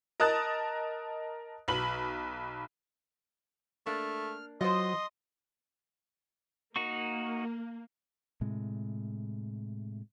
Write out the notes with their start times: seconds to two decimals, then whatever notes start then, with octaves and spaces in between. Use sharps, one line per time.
0.20 A#4 D#5 A5 D#6 F#6 A6
1.68 B1 B4 F#7
3.86 A3 A#3 D4 F6
4.61 F#3 F4 C5 D#5 C6 D#6
6.76 A#3 D#4 F#4 C#6
8.41 A2 C3 G#3